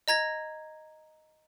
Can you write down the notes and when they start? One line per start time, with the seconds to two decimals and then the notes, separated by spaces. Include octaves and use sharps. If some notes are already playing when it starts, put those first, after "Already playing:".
0.08 D#5 A#5 G#6 A#6